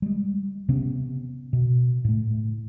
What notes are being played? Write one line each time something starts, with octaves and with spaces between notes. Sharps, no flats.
G3 G#3
C3 B3 C#4
B2
A2 A3